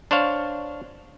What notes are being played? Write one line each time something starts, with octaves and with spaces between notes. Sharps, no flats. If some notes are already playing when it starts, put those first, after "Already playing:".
D4 C5 C#5 F5